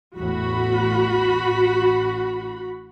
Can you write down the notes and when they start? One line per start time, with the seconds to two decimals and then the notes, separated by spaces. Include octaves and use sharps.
0.17 A1 E2 A2 F#4 B5
1.43 A1